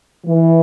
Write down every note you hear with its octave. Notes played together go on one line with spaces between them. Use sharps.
E3